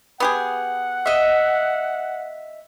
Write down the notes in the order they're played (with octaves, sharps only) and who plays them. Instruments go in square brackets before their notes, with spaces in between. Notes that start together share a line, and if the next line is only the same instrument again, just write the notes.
[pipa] B3 G4 G#4 [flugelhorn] F#5
[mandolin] D#5 E5